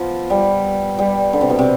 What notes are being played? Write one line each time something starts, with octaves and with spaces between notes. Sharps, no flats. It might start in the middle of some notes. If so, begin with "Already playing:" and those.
Already playing: F3 B3
G3
G3
D3
C3
B2
C3